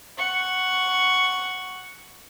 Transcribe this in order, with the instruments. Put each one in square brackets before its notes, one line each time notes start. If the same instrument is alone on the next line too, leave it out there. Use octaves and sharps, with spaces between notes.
[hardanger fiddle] F#5 C#6